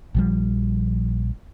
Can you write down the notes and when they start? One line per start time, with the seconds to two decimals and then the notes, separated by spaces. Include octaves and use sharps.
0.15 A#1 F3 G3